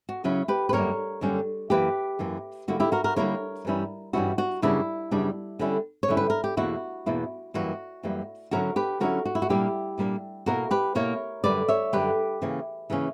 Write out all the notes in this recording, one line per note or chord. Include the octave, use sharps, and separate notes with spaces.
F#4
C#3 F#3 C#4 E4
G4 B4
B4
F#2 D3 G3 A#3 C#4 A#4 C#5
F#2 D3 G3 A#3 C#4
F#2 E3 A#3 E4 G4 B4
F#2 E3 A#3 E4
D3 G3 A#3 E4 F#4
E4 G4
F#4 A#4
F#4 A#4
D3 G3 A#3 E4 A#4 C#5
G2 E3 G3 C#4 E4
G2 E3 G3 C#4 E4 F#4
F#4
F#2 C#3 G3 B3 D4 E4
F#2 C#3 G3 B3 D4
D3 G3 C#4 E4
C#5
D3 G3 C#4 E4
B4
A#4
G4
E2 B2 A#3 E4 F#4
E2 B2 A#3 E4
F#2 E3 G3 A#3 F#4
F#2 E3 G3 A#3
D3 F#3 C#4 E4 F#4 A#4
G4 B4
D3 F#3 C#4 E4 F#4 A#4
F#4
E4
F#4
A#2 G3 A#3 D4 E4 G4
A#2 G3 A#3 D4
B2 A#3 E4 F#4 A#4
G4 B4
B2 A#3 E4 A#4 C#5
F#2 D3 G3 B4 D5
C#5 E5
F#2 D3 G3 G4 B4
C#3 E3 A#3 C#4
C#3 E3 A#3 C#4